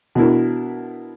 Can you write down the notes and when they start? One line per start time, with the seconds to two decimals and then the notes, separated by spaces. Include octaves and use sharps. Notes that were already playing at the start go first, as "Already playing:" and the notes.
0.15 B2 D4 E4 A#4